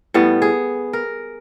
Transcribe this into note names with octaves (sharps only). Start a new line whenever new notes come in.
A2 G3 B3
G#4
A#4